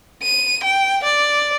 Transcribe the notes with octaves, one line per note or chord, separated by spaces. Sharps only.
D#7
G5
D5